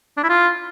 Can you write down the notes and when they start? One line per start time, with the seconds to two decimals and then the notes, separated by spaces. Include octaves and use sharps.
0.17 D4
0.23 E4
0.29 F4